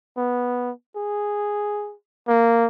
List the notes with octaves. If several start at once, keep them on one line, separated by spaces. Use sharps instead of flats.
B3
G#4
A#3